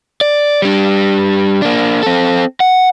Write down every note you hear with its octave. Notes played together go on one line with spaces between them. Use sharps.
D5
G3 D4
A#3 D4
C4 A4
F#5